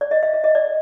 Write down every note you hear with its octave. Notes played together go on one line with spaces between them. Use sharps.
D5
D#5
E5
D#5
D#5
D5